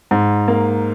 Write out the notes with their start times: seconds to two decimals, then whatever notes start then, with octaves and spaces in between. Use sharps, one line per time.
0.11 G#2
0.48 A#3